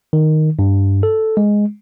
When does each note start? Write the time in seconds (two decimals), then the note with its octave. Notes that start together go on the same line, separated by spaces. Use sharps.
0.13 D#3
0.59 G2
1.03 A4
1.37 G#3